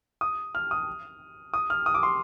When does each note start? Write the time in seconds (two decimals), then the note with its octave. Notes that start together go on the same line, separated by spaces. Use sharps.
0.21 D#6
0.55 F6
0.71 D#6
1.54 D#6
1.70 F6
1.86 D#6
1.94 D6
2.03 C6